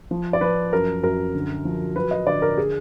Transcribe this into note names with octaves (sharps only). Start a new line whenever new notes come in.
F3
D5
F3 B4
F#2 A#4
F#2 A#4
D3
F3
F#3 B4
D#5
D3 D5
A#4
G#4